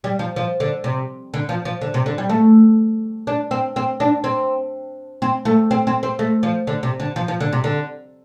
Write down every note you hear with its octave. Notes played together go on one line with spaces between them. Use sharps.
G3
F3
F3
D3
C3
D3
F3
F3
D3
C3
D3
G3
A3
D4
C4
C4
D4
C4
C4
A3
C4
C4
C4
A3
F3
D3
C3
D3
F3
F3
D3
C3
D3